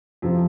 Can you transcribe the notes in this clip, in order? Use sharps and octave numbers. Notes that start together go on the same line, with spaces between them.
F2 C3 F3